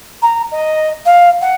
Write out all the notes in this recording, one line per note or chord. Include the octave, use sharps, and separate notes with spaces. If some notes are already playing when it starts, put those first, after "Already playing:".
A#5
D#5
F5
F#5